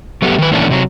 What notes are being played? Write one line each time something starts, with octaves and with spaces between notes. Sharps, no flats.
F#3 A3 B3 F4 G4
D#3 B4
A#2 D#3 E3 A3 C#4 D4
C3 F#3